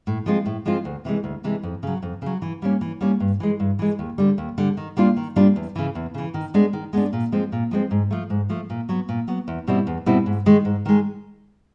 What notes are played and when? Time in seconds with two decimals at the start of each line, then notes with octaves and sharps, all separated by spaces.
0.07 A2
0.26 F3 G#3 C4 F4
0.46 A2
0.66 F3 G#3 C4 F4
0.85 D2
1.05 C3 E3 G#3
1.24 D2
1.44 C3 E3 G#3
1.63 F2
1.83 C#3 F#3
2.03 F2
2.22 C#3 F#3
2.42 E3
2.62 G3 A#3 C#4
2.81 E3
3.01 G3 A#3 C#4
3.20 G2
3.40 E3 G#3
3.60 G2
3.79 E3 G#3
3.99 D#2
4.18 D3 G3
4.38 D#2
4.58 D3 G3
4.77 D#3
4.97 G3 A#3 D4 F4
5.16 D#3
5.36 G3 A#3 D4 F4
5.56 E2
5.76 C#3 E3
5.95 E2
6.14 C#3 E3
6.34 D#3
6.54 G#3 B3 D4
6.73 D#3
6.93 G#3 B3 D4
7.13 A#2
7.32 F3 G#3 C4
7.52 A#2
7.71 F3 G#3 C4
7.91 G#2
8.11 F3 A3
8.30 G#2
8.50 F3 A3
8.70 A#2
8.89 F#3 B3
9.09 A#2
9.28 F#3 B3
9.48 E2
9.67 B2 G3 C4 E4
9.87 E2
10.06 B2 G3 C4 E4
10.26 G#2
10.46 D#3 G#3
10.65 G#2
10.86 D#3 G#3